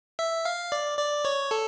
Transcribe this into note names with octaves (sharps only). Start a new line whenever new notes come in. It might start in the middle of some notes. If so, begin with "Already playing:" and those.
E5
F5
D5
D5
C#5
A4